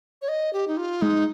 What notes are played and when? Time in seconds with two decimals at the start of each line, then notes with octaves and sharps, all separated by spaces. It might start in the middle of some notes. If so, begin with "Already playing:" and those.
0.22 C#5
0.28 D#5
0.53 G4
0.68 D#4
0.77 F4
1.02 G#3 D#4